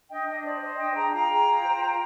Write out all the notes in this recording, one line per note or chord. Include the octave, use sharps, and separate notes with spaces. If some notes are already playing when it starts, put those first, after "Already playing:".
D4 D#5 G5
D4 D#5
C5 D5
C5 D#5
D4 D#5 G5
G#4 G5 A#5
F4 G5 A#5
G#4
F4
C5
F4